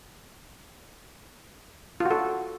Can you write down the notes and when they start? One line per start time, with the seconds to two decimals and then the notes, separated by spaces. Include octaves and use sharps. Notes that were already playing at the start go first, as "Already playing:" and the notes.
2.00 F4
2.05 F#4
2.11 A4